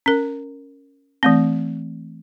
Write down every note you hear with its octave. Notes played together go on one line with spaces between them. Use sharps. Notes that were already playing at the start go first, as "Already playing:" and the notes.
C#4 A#4
E3 A3 C4